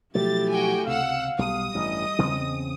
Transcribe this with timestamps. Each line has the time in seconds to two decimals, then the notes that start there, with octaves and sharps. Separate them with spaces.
0.15 B2 F3 F#3 A3 E4 G4 A6
0.49 F#4 G5 G#5
0.87 C#2 C3 F5 F#5 E6
1.39 B1 G3 D#6
1.75 A1 G2 D#5
2.19 E2 C#3 C4